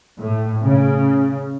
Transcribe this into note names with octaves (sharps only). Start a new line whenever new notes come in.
A2
C#3